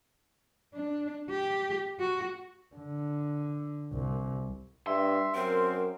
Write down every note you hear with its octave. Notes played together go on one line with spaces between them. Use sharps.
D4
G4
F#4
D3
C2
G2 E5 C6
F#2 C4 A#4